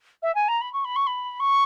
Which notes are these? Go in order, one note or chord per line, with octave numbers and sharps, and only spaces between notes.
E5
G#5
A#5
B5
C#6
B5
C#6
B5
C#6